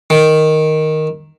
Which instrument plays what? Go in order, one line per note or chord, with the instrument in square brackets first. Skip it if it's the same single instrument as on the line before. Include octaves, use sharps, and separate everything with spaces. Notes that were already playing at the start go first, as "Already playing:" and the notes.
[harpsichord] D#3